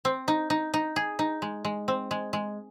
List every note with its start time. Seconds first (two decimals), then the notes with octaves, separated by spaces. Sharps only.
0.05 C4
0.28 D#4
0.50 D#4
0.74 D#4
0.96 G#4
1.19 D#4
1.42 G#3
1.65 G#3
1.88 C4
2.11 G#3
2.33 G#3